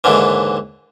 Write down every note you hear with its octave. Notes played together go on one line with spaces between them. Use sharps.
D#2 G#2 D3 E3